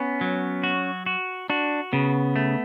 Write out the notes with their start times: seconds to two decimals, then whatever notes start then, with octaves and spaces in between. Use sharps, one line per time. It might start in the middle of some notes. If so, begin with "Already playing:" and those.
Already playing: B3 C#4
0.21 F#3
0.64 F#4
1.06 F#4
1.50 D4 F#4
1.93 C#3 B3
2.36 A3